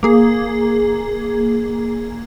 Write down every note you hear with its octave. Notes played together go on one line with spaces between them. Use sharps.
A#3 G#4